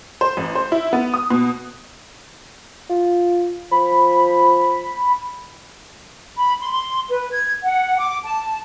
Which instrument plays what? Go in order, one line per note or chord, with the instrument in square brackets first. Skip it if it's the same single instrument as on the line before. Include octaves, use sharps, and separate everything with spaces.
[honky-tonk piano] C5
A1
C5
E4
B3
D#6
B2
[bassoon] F4
[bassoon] F3 [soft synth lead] B5
[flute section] B5
C6
C6
B4
G#6
F#5
D6
A5